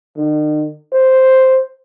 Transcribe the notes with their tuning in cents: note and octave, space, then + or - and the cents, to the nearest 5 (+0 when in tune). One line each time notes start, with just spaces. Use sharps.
D#3 -45
C5 +0